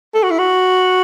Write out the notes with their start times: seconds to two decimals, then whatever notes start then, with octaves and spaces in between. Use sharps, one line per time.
0.14 A4
0.23 F#4
0.30 E4
0.39 F#4